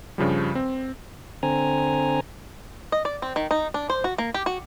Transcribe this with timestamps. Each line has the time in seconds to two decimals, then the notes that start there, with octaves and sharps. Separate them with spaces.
0.18 G2 C#3 F3 G3
0.55 C4
1.43 D3 C4 G#5 A#5
2.92 D#5
3.05 D5
3.22 C4
3.36 D#3
3.51 D#4
3.74 D4
3.90 C5
4.04 F#4
4.18 A#3
4.34 G4
4.46 F#4